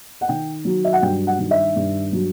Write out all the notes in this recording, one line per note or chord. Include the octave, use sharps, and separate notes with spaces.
F#5
D#3 G5
F#3
E5
F#5
G2 G5
F#5
D#3
E5
G2
F#3